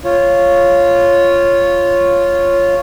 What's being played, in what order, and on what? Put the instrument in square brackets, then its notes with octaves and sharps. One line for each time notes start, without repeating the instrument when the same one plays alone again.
[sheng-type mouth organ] F4 C#5